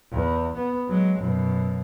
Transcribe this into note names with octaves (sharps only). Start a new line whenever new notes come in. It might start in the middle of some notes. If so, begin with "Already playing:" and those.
E2
B3
F#3 G#3
F#2 B2